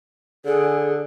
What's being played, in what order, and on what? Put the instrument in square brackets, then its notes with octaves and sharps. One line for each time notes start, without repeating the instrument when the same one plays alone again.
[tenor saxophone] D3 [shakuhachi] G#4